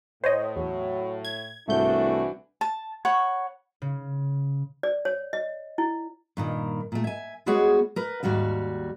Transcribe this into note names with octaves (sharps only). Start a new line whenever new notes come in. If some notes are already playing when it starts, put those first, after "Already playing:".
A2 C5 C#5 D#5
E2 F#3
G#6
C2 G#2 E3 A3 D4 F#4 G6
A5
C#5 F#5 B5 C#6
C#3
D5
C#5
D#5
E4
G2 A#2 D#3
A#2 A3
E5 G#5
G3 G#3 B3 F#4 G#4 C#5
A#4 B4
D#2 G#2 G3 F#4 F5